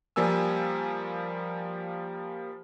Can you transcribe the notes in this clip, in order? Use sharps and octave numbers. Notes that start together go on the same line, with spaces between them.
F3 G3 A#3 G#5 E6